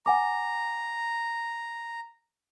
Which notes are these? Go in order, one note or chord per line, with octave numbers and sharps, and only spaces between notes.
F#5 G#5 A#5 D6